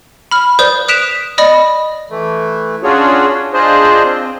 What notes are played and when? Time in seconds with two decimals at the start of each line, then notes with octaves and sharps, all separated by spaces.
0.31 B5 F6
0.59 B4 C5 D5 D#6 G6
0.88 D#6 F#6 B6 D7 E7 F7
1.38 D5 D#5 B5 D#6 A#6
2.10 E3 A3
2.83 C#4 D4 F4 F#4 G#4 C#5
3.53 D4 F4 G#4 C5 D#5
4.04 C4